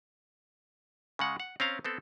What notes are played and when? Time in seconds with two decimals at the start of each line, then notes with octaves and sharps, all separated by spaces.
1.19 C#3 G#3 F#5
1.40 F#5
1.60 C4 C#4 F5 A#5
1.85 B3 C4 A4